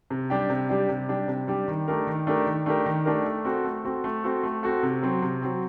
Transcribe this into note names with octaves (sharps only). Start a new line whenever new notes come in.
C3
G3 D4 G4
C3
G3 D4 G4
C3
G3 D4 G4
C3
G3 D4 G4
D#3
A3 D4 G4 A#4
D#3
A3 D4 G4 A#4
D#3
A3 D4 G4 A#4
D#3
A3 D4 G4 A#4
A3
C4 F#4 A4
A3
C4 F#4 A4
A3
C4 F#4 A4
A3
C4 F#4 A4
C3
F#3 C4
C3
F#3 C4